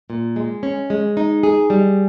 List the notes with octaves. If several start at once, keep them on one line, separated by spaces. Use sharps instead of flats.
A#2
G#3
C#4
G#3
D#4
G#4
G3